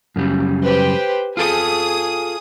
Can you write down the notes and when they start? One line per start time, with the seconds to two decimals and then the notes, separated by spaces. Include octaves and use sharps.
0.16 F#2 C#3 G3
0.63 G4 B4 C5
1.37 F4 G#4 A4 D#6